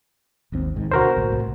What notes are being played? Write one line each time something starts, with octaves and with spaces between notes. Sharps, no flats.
G#1 D#2 C4
C2 G#2 D#3
D2 B2 D3 F#4 A#4 C5
A#1 A2
C2 A2